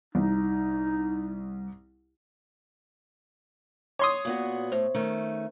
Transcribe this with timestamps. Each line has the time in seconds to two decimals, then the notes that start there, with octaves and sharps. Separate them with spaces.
0.15 C2 D#4
3.99 C#5 C6 D#6
4.25 A#2 B3 F#4
4.72 A2 C5
4.95 D#3 A3 C#4